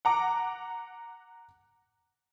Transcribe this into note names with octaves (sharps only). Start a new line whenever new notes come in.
F#5 A#5 D6